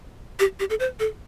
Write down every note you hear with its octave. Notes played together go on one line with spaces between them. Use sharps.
G4
G4
A4
C5
A4